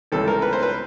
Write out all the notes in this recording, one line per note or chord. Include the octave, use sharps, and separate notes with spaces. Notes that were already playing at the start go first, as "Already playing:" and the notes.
C#2 C3 E3 G3 A4
A#4
B4
C5
B4